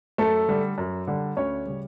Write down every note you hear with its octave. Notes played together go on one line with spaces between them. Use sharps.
F#2 A3 A4
D3 G3
F#2
D3 G3
D2 C#4 C#5
C#3 G3